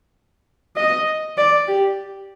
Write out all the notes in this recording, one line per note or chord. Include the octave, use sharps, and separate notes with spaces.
D#5
D5
G4